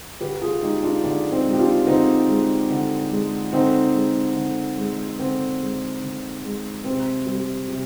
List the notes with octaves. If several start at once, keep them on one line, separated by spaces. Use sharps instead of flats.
D3 G4 B4
F4 G#4
G#3 D#4 G4
D4 F4
D3 D4
C4 D#4
G#3
G4
D4 F4
D3 C4 D#4
G#3
D3
G#3
D3 C4 D#4
G#3
D3
G#3
D3 C4
G#3
D3
G#3
C3 C4
G3
C3